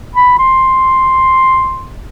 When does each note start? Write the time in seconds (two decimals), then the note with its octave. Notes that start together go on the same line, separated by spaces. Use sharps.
0.15 B5
0.39 C6